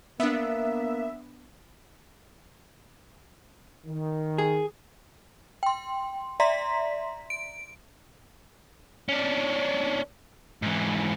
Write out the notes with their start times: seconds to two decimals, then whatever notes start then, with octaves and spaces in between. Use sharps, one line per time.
0.20 A#3 B3 D4 E5
3.86 D#3
4.38 G#4
5.63 G5 C6
6.40 D5 E5 A#5 C6 B6
7.30 D7
9.09 C#4 D4
10.62 G#2 E3